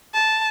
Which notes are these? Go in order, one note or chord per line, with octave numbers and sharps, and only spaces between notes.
A5